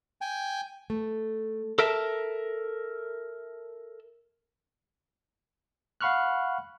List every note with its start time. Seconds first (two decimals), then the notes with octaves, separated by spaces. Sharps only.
0.21 G5 G#5
0.90 A3
1.79 A4 A#4 E5 A5
6.01 F5 F#5 B5 C#6 F6 F#6